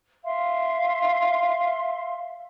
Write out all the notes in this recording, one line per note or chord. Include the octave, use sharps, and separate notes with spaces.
E5 F5 C6